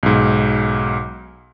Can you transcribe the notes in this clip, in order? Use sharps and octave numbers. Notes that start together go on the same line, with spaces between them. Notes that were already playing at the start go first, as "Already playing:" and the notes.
B1 G#2